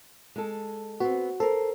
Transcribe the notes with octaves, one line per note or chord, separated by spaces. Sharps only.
G#3 A4
B3 C4 F#4
A4 A#4 C5